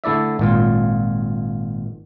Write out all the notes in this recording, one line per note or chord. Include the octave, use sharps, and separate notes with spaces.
D3 A3 E4 D5 E5
G#1 A#2 F4